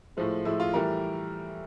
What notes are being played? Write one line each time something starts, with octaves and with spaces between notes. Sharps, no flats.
A2 F3 G#3
A2 F3 G#3 E4
F4
A2 E3 G3 A#4